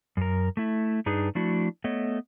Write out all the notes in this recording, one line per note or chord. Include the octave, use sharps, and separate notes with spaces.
F#2 A#4
A3 E4
G2 D4 D#4 G#4 B4
F3 A3 D4 E4 F#4
A3 B3 C#5 D#5